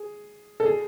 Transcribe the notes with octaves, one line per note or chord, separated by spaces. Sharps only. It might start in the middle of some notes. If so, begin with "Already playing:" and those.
Already playing: G#4
A4
G#4